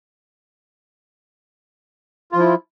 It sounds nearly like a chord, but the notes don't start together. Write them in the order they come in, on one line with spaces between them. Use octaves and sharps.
F4 F3 E4